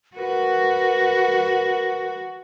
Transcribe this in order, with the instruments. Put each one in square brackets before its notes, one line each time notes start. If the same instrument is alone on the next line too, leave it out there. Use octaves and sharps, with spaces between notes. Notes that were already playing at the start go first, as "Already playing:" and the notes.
[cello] F#4 [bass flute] A#4 [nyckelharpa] B4